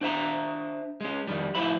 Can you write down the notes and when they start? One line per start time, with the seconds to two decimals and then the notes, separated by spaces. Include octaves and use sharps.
0.01 D4 C5 E5 A#5
1.01 G#3 C#4
1.27 F2 D#3 G3
1.55 A2 F3 E4 C5 E5 B5